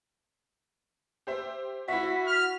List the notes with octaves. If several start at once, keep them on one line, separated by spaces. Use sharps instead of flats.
G4 C5 E5
E4 F#4 E5 B6
F6